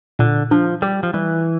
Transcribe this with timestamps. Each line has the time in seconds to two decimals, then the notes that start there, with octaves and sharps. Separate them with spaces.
0.19 A#2 D3
0.51 F3 D4
0.82 G3 G4
1.03 F3
1.14 E3 G3